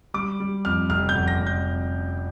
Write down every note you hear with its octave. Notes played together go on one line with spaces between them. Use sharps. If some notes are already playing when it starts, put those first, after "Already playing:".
G3 D6
G3
F2 F6
F1 F6
G6
F1
A#6
F1
G6
F2